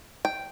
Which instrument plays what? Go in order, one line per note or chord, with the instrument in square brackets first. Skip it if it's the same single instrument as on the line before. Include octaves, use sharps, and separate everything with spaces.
[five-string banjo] G5